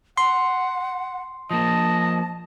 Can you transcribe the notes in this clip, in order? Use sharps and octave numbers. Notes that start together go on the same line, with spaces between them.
F#5 C6
F3 A#3 D#5 A5